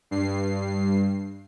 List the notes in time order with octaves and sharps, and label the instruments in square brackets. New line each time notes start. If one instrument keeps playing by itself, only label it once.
[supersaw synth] G2 C7